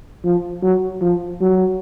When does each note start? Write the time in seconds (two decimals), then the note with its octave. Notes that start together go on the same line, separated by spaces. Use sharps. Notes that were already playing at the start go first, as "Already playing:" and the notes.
0.24 F3
0.63 F#3
1.02 F3
1.41 F#3